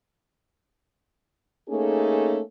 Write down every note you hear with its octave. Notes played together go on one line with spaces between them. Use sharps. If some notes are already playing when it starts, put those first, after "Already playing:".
A3 A#3 C#4 D#4 G#4 A4